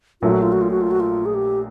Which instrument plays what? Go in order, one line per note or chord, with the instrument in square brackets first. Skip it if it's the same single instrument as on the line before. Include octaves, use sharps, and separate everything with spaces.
[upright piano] A#1 A#2 F#3 A3 [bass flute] F4
[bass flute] F#4
F4
F#4
F4
F#4
F4
F#4
F4
G#4
G4